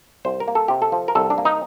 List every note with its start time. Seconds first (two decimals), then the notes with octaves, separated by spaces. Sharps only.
0.25 C2 C5
0.40 A#4
0.48 A#3
0.55 A4
0.68 C3 G4
0.82 A4
0.92 F3
1.08 A#4
1.15 C2 A4
1.30 D4
1.38 A#3
1.45 D#4